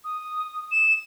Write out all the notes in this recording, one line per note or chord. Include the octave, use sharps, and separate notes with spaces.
D#6
E7